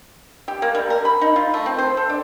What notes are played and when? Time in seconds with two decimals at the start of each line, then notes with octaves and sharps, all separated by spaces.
0.48 G4
0.62 A#3
0.75 G3
0.90 A#4
1.05 B5
1.21 D#4
1.36 F4
1.54 A3
1.66 C4
1.78 C5
1.97 A4
2.09 D4